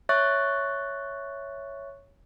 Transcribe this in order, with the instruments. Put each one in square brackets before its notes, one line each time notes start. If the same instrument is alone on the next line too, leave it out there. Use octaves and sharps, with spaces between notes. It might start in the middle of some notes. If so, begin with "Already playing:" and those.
[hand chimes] C#5 E5 C#6 F#6 A6